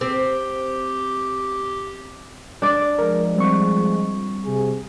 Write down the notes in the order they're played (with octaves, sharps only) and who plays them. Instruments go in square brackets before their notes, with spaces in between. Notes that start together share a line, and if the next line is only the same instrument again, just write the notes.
[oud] C4 [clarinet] G4
[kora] D4 D5
[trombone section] F3 G#3 [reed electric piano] A#4
[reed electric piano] G3 C4 C#6
[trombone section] C3 G#4